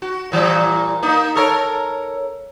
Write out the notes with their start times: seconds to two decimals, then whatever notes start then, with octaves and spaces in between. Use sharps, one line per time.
0.02 F#4
0.32 A#2 E3 G3
1.03 A#3 D#4
1.36 A4 A#4 C#5